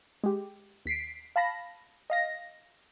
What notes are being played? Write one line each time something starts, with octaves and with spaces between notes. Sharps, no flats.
G#3 G4
D#2 B6 C7 D7
F5 A5 B5 A#6
D#5 F5 A#6